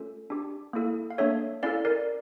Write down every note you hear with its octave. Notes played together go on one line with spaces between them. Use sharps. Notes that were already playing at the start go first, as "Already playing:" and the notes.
Already playing: A3 C#4 F4 A4
D4 G4
A#3 E4 A4
F5
A#3 D4 A4 C#5 E5
C#4 E4 A4 D5 F5
A#4 D5